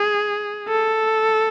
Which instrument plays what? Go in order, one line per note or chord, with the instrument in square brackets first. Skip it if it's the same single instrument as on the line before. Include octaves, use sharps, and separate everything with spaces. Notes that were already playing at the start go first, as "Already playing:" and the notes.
Already playing: [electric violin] G#4
A4